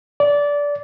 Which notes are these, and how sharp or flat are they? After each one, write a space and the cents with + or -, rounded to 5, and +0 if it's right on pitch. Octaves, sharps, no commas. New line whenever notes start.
D5 -20